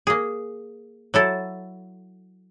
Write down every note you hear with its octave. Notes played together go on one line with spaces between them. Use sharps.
A#3 G#4
F#3 E4 A4